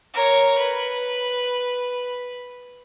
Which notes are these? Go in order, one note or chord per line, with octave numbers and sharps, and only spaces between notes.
A#4 C#5
B4